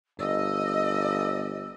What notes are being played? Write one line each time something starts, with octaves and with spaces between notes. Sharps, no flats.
G1 D#5 E6